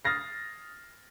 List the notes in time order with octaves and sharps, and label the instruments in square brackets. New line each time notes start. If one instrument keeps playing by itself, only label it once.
[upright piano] D#6 F6 A6 A#6 C7